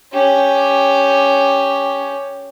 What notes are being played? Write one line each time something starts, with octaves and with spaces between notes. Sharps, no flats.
C#4 G4